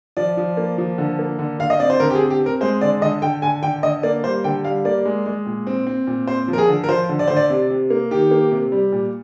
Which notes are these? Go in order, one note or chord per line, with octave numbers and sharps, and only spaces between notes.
F3 D5
F3
A#3
F3
D3
A#3
D3
D3 F5
D#5
C4 D5
C5
D3 A#4
G4
G#4
C4
G4
C4
A#4
G#3 C5
D3 D5
D3 D#5
D3 G5
D3 G#5
D3 G5
D3 D#5
A#3 D5
G3 C5
D3 G5
G3 F5
A#3 D5
G#3
G#3
A#2
C4
C4
A#2
C4 C5
F3
A#4
G#4
D3
A#4
F3 C5
D3
D5
D3 C5
D5
C3
C3
A#3
D#3 G4
A#3
C3
G3
A#2